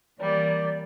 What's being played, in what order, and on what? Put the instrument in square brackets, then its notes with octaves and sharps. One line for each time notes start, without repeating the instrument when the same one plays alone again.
[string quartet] E3 G3 A#3 [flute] D5